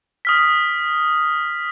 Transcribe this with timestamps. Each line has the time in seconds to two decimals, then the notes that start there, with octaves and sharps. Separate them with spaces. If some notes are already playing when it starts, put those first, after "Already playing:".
0.25 D#6 F6 B6